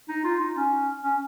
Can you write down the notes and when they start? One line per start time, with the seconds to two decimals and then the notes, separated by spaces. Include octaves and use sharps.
0.09 D#4
0.24 F4
0.40 D#4
0.57 C#4
1.03 C#4